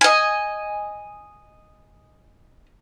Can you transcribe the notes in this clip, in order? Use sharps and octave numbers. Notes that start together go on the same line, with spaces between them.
D#5 G#5